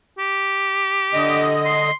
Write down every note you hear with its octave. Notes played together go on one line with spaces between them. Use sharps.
G4
D3 D#5
C6